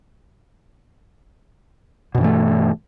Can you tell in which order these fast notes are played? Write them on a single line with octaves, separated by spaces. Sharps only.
B2 G2 E3 A3